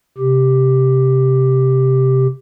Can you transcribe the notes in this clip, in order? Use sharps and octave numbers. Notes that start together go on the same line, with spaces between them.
C3 G4